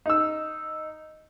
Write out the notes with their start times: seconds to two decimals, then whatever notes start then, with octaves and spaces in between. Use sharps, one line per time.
0.06 D#4 E6